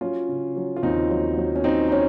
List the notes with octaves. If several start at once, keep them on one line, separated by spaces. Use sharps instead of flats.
F#3 C#4 F4
C#3
F#3
F4
D#2 C4 D#4
F#3
F#3
C#4
F#3 C4 D#4
D#4
C#4